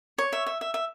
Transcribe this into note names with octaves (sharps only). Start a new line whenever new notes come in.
C#5
E5
E5
E5
E5